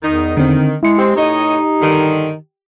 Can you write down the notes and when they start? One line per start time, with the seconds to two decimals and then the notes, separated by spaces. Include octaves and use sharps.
0.03 E2 D#3 D#4
0.37 D3 D#3 C4
0.83 G#3 E4 C#7
0.98 C4 G4
1.16 A2 D#4 C#5 D#5
1.81 G2 D3 D#3